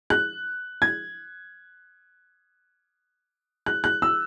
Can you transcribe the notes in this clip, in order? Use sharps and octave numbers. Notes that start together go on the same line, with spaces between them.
F#6
G#6
F#6
F#6
E6